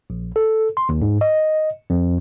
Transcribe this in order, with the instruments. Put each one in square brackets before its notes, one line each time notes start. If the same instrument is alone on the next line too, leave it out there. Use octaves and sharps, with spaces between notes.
[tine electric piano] A#1
A4
C6
D#2
G#2
D#5
F2